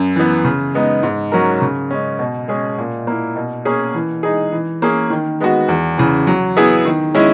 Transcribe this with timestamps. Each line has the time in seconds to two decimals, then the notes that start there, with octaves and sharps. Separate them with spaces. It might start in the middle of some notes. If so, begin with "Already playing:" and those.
Already playing: F#2
0.16 E3 B3
0.44 C#3
0.74 G#3 B3 D#4
1.03 G#2
1.32 F#3 C#4 F#4 A#4
1.61 C#3
1.91 G#3 C#4
2.19 B2
2.48 G#3 C#4 G#4
2.78 A#2
3.07 A#3 E4
3.36 B2
3.65 A#3 C#4 G#4
3.94 E3
4.23 G#3 D#4 G#4
4.52 E3
4.82 A#3 C#4 G#4
5.10 D#3
5.40 G#3 B3 F#4
5.68 E2
5.98 C#3 E3
6.27 F#3
6.57 B3 E4 G#4
6.85 D#3
7.15 G#3 C#4 E4